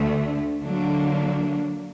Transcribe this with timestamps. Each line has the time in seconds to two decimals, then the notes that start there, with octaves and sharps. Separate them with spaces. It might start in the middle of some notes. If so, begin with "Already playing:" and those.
Already playing: D2 D3 A3
0.63 D3 F#3 A#3 D4